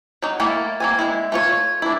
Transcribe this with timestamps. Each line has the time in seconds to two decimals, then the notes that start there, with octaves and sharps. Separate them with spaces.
0.22 F#3 D#4
0.40 A3 A#3 E4 A4 A#4
0.80 A#3 C4 G#5
0.99 G#3 E4
1.32 A3 F4 C#5
1.82 D4 E4